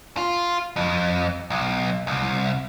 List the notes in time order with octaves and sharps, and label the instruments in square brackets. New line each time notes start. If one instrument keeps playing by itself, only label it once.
[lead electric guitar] F4
F2
B1
C2